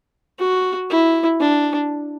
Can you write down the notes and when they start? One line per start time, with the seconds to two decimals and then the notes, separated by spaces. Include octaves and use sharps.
0.39 F#4
0.90 E4
1.40 D4